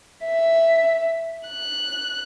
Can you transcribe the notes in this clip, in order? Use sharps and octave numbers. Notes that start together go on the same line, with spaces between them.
E5
F#6